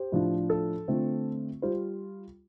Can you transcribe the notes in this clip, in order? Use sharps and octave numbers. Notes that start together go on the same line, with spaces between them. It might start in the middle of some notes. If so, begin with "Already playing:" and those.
Already playing: G4 C5
A2 F3 D4
A4
D3 A3 C4 F4
G3 F4 C5